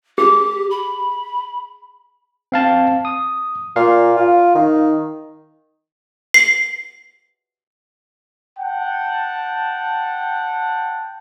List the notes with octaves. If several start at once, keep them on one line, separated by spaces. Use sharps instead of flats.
G4 G#4
B5
C4 F5 A5
D#6
A#2 F5
F4
D#3
C7
F#5 G5 A5